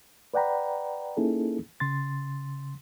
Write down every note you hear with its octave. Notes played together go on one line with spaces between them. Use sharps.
B4 D5 F#5 G5 A#5 B5
A#3 C#4 D#4 E4 G#4 A4
C#3 C6 A6